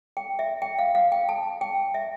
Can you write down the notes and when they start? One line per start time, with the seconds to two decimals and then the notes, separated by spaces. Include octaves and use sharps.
0.17 G5
0.39 E5
0.62 G5
0.79 F5
0.95 F5
1.12 G5
1.29 A5
1.61 G5
1.94 E5